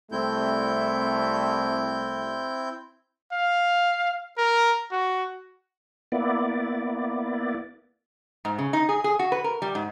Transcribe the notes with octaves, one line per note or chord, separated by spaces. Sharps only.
C2 G3 A3 C4 E4 G6
F5
A#4
F#4
A#3 B3 E4 D5
G#2
C#3
D#4
G#4
G#4
F#4
B4
A#4
G3
G#2